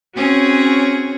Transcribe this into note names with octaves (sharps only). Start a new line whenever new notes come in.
C4 C#4 F#4 G#4 C#5